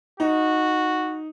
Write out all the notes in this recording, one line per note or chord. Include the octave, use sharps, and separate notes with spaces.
D#4 F#4